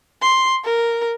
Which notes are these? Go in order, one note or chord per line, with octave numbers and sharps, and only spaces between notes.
C6
A#4